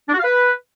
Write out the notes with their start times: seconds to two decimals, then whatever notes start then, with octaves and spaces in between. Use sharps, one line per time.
0.09 D4
0.14 F#4
0.19 F5
0.24 B4